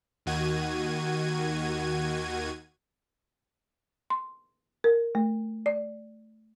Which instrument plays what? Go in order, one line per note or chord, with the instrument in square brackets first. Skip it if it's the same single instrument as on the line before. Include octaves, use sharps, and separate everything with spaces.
[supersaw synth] D#2 D#3 F#4 G#6 D#7
[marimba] C6
A#4
A3
D5